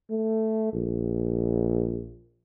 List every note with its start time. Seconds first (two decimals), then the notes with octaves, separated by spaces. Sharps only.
0.10 A3
0.73 A#1